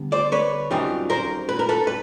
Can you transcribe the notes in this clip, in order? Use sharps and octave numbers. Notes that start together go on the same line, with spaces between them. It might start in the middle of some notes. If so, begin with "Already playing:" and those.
Already playing: D3 G3 B3
C5 D5
B4 C#5
F#2 D#3 G3 C4 F4
A#4 C5
B4
A#4
A4 B4
B4